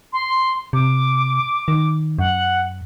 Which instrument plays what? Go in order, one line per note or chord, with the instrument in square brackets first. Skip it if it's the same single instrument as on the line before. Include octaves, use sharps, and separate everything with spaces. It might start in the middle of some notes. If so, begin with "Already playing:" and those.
[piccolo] C6
[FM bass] C3 [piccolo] D6
[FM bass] D#3
[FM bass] F#2 [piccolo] F#5